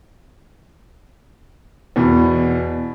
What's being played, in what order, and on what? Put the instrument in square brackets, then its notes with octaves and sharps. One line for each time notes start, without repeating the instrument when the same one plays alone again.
[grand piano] E2 B2 E3